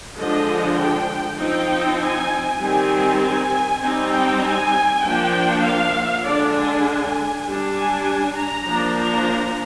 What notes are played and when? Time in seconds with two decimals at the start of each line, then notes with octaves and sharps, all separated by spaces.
0.18 D3 F3 G#3 D4 D#5
0.78 G5
1.39 F3 C4 D#4 G5
2.00 G#5
2.61 D#3 G3 C4 D#4 G#5
3.21 G#5
3.82 G3 C4 D#4
4.12 G5
4.43 G#5
5.02 F3 A#3 D4 G5
5.64 F5
6.24 D3 G#3 D4 D5
6.54 G#5
7.45 G3 D4
7.75 G#5
8.36 A#5
8.67 F3 A#3 D4
8.97 A#5